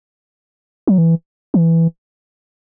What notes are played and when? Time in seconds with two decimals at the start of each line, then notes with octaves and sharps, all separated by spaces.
0.87 F#3
0.98 E3
1.54 E3